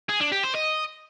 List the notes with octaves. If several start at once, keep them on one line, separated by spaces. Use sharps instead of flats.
G#4
D4
G4
C5
D#5